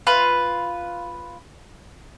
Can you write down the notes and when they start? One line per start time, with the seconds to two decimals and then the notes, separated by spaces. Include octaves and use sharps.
0.07 F4 B4